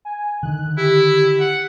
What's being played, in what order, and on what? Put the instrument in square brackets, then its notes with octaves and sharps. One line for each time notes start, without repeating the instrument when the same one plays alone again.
[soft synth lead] G#5
[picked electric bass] D3 D#3 [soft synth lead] F#6
[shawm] E4 [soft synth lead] G4
[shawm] F#5